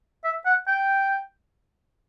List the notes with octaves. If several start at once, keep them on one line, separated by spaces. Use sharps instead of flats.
E5
F#5
G5